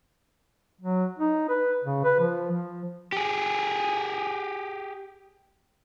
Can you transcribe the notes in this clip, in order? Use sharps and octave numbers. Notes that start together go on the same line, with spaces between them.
F#3
D#4
B4
C#3
B4
F3
F3
G4 G#4